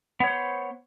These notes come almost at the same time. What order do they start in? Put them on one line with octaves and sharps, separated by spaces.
B3 C#5 C5